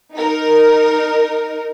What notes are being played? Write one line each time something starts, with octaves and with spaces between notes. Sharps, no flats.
D#4 A#4